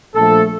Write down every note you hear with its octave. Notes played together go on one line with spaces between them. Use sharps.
A#1 A#2 F3 A3 A4